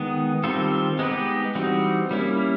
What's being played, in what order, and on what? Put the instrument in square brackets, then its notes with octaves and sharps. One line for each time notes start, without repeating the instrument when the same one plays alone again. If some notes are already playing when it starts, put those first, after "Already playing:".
Already playing: [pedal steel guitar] D#3 G#3 B3
D#3 G3 C4 F4 A4
G#3 B3 D#4 G4 B4
E3 G3 C4 D#4 F#4
G3 A#3 C#4 E4